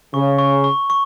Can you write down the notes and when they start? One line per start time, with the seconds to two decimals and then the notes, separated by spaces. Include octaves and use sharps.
0.13 C#3 C#6
0.38 C#6
0.64 C#6
0.90 C#6